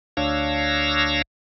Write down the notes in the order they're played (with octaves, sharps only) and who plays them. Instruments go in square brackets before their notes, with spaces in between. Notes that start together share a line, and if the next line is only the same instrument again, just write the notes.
[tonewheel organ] D2 D4 C#5 F5 E6 A#6